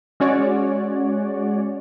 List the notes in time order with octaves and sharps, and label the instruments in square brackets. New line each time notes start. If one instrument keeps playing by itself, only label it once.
[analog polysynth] G#3 C#4 F#4 C#5 D5